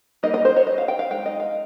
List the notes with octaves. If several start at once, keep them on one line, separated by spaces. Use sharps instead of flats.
G3 A#3 D#4 D#5
D#5
C5
C#5
D#5
F5
G5
F5
G#3 D#4 G5
D#5
F5